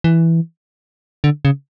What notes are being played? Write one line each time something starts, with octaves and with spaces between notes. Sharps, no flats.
E3
D3
C#3